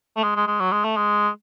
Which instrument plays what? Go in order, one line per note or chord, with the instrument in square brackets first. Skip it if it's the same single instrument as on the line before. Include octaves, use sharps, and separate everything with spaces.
[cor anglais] A3
G#3
G#3
G#3
F#3
G#3
A3
G#3